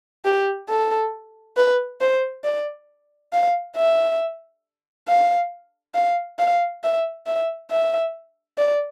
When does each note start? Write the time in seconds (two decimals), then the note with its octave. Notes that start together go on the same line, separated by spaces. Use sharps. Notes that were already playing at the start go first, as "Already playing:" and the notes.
0.25 G4
0.69 A4
1.57 B4
2.00 C5
2.44 D5
3.33 F5
3.76 E5
5.08 F5
5.94 F5
6.39 F5
6.83 E5
7.26 E5
7.71 E5
8.58 D5